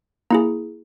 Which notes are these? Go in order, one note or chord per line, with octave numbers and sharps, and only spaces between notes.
A#3 E4 G#4 A#5